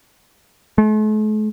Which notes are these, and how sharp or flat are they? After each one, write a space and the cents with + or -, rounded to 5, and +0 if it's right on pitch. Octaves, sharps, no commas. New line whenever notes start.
A3 -45